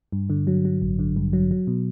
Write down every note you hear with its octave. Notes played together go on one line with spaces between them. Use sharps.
G2
D3
F#3
F#3
A1
D3
G2
F#3
F#3
B2